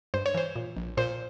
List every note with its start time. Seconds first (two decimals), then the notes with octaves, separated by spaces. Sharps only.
0.14 G2 C5
0.26 C#5
0.34 E3 C5
0.56 A#2
0.77 A#1
0.97 A#2 C5